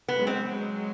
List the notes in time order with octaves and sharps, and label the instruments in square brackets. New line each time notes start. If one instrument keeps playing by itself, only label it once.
[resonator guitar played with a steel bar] B3
[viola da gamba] F#3 G#3
[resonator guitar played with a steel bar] C4
[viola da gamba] F#3 G#3